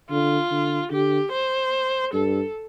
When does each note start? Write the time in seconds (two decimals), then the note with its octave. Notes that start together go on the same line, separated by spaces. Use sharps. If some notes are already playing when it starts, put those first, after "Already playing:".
0.10 D3 F4
0.51 D3
0.91 D3 G4
1.32 C5
2.13 G2 A4